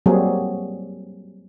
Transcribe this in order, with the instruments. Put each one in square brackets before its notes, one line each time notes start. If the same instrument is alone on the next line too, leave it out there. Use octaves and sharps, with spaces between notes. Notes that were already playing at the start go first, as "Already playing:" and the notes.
[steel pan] F#3 G3 A#3 C4 G#4